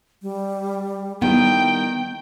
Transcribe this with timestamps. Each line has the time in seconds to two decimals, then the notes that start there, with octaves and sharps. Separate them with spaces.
0.22 G3
1.22 D#3 G3 B3 E4 G5